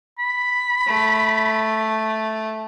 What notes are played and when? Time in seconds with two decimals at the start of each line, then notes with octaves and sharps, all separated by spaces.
0.19 B5
0.87 A3